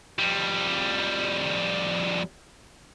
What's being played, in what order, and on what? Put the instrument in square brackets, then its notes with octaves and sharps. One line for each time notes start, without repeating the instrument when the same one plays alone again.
[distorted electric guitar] F2 G3